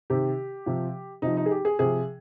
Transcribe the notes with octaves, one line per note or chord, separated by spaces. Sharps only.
C3 D#3 G4
C3 F3
C3 F3 D#4
D#4
G#4
G4
G#4
C3 F3 G#4